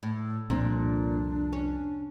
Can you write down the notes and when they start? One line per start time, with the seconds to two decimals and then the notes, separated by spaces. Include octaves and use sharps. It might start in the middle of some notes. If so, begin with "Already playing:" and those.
0.03 A2
0.50 C2 F2 A#2 C4 D4
1.53 C#4